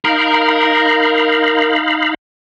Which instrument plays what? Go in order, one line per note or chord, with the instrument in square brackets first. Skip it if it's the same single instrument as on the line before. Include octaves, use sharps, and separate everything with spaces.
[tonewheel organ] D#4 F5 B5 [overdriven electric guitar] A#4